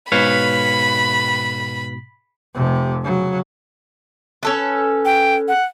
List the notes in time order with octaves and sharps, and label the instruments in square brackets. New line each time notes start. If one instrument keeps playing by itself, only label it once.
[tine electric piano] G#2 B2 [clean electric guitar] B4 C#5 F5 [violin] B5
[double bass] F1 C3
C#3 F#3
[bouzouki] C#4 A4 B4
[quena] G5
F#5